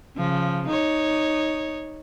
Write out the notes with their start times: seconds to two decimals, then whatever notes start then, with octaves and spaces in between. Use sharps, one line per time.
0.17 C#3 F3
0.68 D#4 C#5